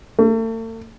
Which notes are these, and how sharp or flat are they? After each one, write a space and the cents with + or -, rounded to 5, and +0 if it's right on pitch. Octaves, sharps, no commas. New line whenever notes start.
A3 +40